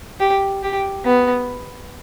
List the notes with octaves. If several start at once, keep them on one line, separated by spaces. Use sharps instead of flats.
G4
G4
B3